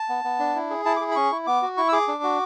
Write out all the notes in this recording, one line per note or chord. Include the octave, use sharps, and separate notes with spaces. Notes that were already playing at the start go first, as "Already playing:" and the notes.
Already playing: A5
B3
B3
D4
E4
G#4
E4 A5
D6
G#4
B5
C#4 C#6
E4
B3 D6
F#4
E4 C#6
E6
G#4 D6
D4
F#4